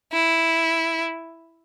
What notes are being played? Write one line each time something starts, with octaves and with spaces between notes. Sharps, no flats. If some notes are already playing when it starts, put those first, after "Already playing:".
E4